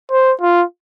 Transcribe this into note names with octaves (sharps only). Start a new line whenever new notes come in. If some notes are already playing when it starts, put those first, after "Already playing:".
C5
F4